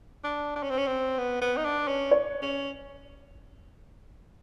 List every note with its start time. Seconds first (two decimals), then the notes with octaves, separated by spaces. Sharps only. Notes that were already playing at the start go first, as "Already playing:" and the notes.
0.24 D4
0.56 D4
0.63 C#4
0.70 C4
0.77 C#4
0.87 C4
1.18 B3
1.41 B3
1.57 D#4
1.65 D4
1.88 C#4
2.11 C#5
2.42 C#4